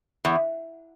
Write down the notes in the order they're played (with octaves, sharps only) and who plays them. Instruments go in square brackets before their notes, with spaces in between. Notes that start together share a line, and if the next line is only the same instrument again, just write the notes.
[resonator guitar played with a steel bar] E2